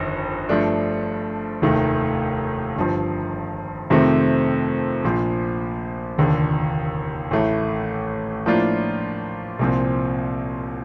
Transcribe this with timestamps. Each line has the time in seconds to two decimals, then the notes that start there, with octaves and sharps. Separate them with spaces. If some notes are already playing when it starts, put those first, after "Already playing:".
Already playing: G1 F2 D#3
0.49 G2 F3 A3 D4
1.62 F1 D#2 D#3 A3
2.76 G1 G2 F3
3.90 F2 C3 D#3 A3 C4
5.04 A#1 A#2 F3
6.18 F1 D#2 D3
7.31 A1 A2 A3
8.46 A2 F3 A#3 D4 F4
9.59 C2 A#2 F3 C4